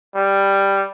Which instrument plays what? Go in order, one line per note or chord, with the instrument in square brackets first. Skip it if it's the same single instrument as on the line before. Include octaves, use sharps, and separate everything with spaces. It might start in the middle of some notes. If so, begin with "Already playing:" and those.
[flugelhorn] G3